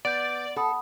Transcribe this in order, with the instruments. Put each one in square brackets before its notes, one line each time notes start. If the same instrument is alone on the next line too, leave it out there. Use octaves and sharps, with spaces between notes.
[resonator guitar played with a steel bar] B3 [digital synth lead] D5 [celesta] G6 D7
[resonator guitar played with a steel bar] A4 [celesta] F#5 B5 D#6